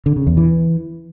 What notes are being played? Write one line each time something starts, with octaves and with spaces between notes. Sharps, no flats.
D3
C#3
E2
E3